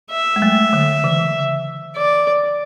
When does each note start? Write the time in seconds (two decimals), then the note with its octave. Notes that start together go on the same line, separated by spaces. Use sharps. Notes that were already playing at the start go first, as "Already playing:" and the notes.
0.11 E5
0.36 G#3
0.42 F#3 A3
0.73 D3 F#3
1.04 C#3 E3
1.97 D5